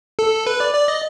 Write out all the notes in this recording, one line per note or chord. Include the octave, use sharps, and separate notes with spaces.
A4
B4
D5
D5
D#5